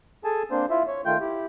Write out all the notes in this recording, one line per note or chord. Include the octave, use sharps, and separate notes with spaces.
G#4 A4 G#5 A5
A#3 C4 D4 C5
E4 F4 E5
C#5
D#3 A3 F4 G5 G6
E4 G4